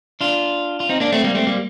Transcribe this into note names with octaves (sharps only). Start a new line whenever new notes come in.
D4 F4
F4
C4 D#4
A#3 D4
A3 C4
G3 A#3
A3 C4
G3 A#3